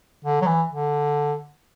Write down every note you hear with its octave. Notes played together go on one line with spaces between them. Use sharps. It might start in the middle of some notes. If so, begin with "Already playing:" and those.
D3
F#3
E3
D3